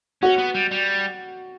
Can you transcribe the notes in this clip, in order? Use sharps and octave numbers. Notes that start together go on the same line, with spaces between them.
C#4 F#4
B3
G3
G3